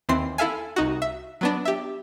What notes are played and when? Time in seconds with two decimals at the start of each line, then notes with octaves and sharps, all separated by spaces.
0.09 D#2 E3 C4 C6 C7
0.38 E4 A4 E5 F5 G#5
0.76 C2 D#4 F#4
1.02 E5
1.41 F#3 B3 D4
1.65 G4 E5